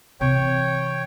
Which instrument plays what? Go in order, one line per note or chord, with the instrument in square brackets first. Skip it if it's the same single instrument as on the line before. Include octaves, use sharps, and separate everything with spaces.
[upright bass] C3 E3 [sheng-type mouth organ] C#5 G5